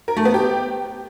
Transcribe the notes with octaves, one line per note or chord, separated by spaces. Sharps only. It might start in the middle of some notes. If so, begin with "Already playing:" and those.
A#4
A3
B3
G4